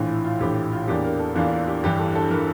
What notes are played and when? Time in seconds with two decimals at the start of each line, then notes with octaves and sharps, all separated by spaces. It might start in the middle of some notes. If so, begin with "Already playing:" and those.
Already playing: A#1 A2 E3 F4
0.09 E4
0.24 F4
0.40 A#1 A2 E3 G4
0.56 E4
0.72 F4
0.88 E2 E3 A#3 D4 G4
1.04 A#4
1.19 A4
1.35 E2 E3 A#3 D4 F4
1.51 F4
1.67 G4
1.83 G1 G2 E3 G4
1.99 A4
2.15 A4
2.30 E3 A#4